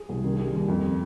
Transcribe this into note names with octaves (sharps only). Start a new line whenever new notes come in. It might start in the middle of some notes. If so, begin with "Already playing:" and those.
Already playing: G#4
C2
D#3
G3
D#2
F2